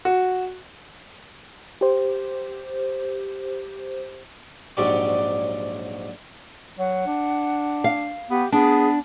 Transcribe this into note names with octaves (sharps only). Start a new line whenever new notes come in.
F#4
G4 C5
A#1 G#2 F#3 G4 D5 C#6
F#3 F#5
D4
F5
B3 G4
B3 D4 G#4